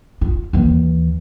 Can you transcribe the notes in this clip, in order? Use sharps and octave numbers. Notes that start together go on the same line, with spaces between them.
F4
D#2 E3